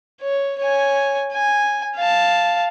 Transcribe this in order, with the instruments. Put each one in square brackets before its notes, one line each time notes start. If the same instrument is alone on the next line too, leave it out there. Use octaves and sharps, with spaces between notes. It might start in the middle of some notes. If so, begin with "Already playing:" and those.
[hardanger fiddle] C#5
C#5 G#5
G#5
F5 A5